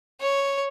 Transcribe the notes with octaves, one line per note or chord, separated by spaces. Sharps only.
C#5